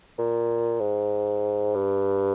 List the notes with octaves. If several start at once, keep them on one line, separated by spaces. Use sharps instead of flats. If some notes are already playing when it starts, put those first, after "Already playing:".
A#2
G#2
G2